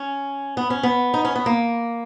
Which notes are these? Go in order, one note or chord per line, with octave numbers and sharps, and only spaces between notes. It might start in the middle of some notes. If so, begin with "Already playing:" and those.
Already playing: C#4
B3
C#4
B3
D#4
C#4
B3
A#3